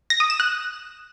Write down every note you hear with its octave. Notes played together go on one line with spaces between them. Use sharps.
A#6
D#6
E7
F#6